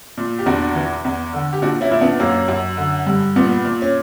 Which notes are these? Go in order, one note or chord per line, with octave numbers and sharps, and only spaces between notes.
A#2
G4
E2 D4 F#4
E3
E2
D3
G4
A#2 D4 F#4
C#4 E4
A#2 E4
B3 D4
F#2 A#3 C#4
F#2
D3
G2
A#2 B3
A#2
C#4